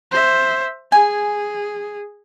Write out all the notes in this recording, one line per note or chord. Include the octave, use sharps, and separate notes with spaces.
C5 E5
G#4 G#5